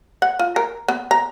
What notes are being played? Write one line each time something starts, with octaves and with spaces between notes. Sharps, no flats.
F#5
F4
A#4
B3
A#5